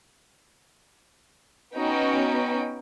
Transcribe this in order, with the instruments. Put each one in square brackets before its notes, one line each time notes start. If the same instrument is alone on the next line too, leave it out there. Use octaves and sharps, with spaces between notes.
[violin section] B3 C#4 D#4 F#4 G5